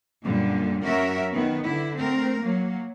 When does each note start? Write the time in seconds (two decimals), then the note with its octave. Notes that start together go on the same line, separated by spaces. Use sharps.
0.25 F#2 A#2 D3 G3
0.84 F#2 C#4 F#4 A#4 E5
1.33 D#3 B3
1.64 D3 E4
1.97 A3 C4 A#4
2.43 F#3 A#3